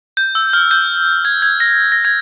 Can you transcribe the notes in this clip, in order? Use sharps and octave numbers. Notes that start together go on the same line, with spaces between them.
G6
E6
F6
G6
G#6
G#6
A#6
A#6
G#6